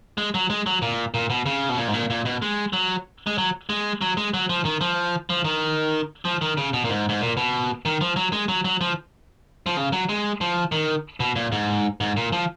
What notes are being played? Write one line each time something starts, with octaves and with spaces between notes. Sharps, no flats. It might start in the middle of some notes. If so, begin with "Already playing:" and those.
G#3
F#3
G#3
F#3
A#2
A#2
B2
C#3
B2
A#2
G#2
A#2
A#2
B2
G#3
F#3
G#3
F#3
G#3
F#3
G#3
F#3
F3
D#3
F3
F3
D#3
F3
D#3
C#3
B2
A#2
G#2
G#2
A#2
B2
D#3
F3
F#3
G#3
F#3
F#3
F3
F3
C#3
F#3
G#3
F3
D#3
B2
A#2
G#2
G#2
A#2
F3